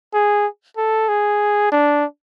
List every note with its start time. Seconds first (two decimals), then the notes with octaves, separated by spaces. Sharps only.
0.14 G#4
0.77 A4
1.08 G#4
1.72 D4